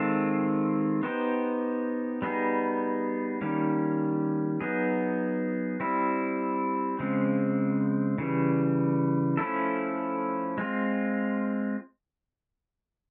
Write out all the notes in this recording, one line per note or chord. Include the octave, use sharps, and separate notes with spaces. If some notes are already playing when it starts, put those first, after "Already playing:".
Already playing: D#3 G#3 C4 F4 A4
B3 D#4 G4 C5
G3 B3 D#4 G#4
D#3 G3 A#3 C#4
F#3 B3 D#4 G#4
G3 C4 E4
C#3 F3 G#3 C4
C#3 E3 G3
F3 A3 C#4 E4 A4
G#3 C4 F4